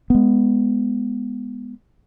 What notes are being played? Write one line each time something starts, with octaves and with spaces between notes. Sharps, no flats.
G#3 B3